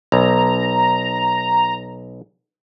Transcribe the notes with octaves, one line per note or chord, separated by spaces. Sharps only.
B1 A#5